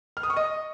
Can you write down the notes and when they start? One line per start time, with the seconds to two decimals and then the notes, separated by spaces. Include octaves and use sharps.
0.17 F6
0.23 D#6
0.30 C#6
0.36 D#5